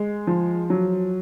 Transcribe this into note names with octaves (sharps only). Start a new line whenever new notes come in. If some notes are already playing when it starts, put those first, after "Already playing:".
Already playing: G#3
F3
F#3